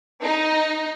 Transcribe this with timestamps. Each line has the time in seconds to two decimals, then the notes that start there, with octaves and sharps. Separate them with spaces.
0.22 D#4